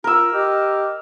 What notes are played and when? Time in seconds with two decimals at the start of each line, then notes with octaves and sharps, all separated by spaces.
0.04 F4 A#4 E6
0.33 G4 D#5